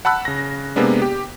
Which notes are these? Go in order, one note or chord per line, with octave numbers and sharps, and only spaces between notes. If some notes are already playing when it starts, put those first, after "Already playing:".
F#5 A5 B5 E6 F#6
C#3 A#6
C3 G#3 A#3 B3 D4
G4